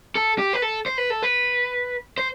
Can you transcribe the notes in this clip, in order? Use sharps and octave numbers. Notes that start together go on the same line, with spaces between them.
A4
G4
B4
A4
C5
B4
A4
B4
C5